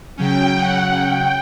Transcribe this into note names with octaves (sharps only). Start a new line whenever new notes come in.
C#3 F#3 C#4 G5
F#5
G5